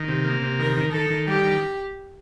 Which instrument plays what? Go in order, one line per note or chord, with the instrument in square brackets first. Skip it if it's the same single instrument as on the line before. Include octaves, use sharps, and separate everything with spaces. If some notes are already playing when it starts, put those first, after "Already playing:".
Already playing: [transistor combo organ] D#3
C3
A#3
C3
[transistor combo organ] D#3 [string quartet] A#4
[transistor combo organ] D#3
[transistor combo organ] D#3 [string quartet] A4
[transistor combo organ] D#3
[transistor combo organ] G3 [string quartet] G4
[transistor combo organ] D#3